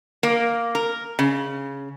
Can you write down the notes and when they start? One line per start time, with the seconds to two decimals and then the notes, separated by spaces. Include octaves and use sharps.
0.23 A#3
0.75 A#4
1.19 C#3